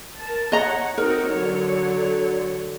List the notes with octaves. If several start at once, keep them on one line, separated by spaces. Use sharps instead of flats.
A#4 A5
C#5 D#5 F#5 A#5
C4 D#4 F#4 A#4
D3 F#3 C#5